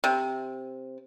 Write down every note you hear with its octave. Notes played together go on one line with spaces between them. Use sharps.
C3